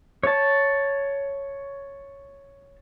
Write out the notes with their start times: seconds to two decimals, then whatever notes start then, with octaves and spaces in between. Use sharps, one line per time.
0.23 C#5 A5